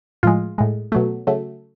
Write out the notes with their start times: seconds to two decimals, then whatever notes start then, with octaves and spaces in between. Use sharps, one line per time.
0.23 A2 F3 G#3 F4
0.58 A2 G#3
0.92 B2 F#3 A3
1.27 C#3 F#3 A3